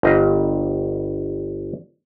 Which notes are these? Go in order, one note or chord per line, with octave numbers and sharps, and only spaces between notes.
G1 G4 D#5 F5